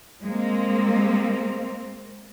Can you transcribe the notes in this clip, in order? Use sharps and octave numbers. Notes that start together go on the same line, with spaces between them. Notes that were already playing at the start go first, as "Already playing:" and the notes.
G#3 A#3 C4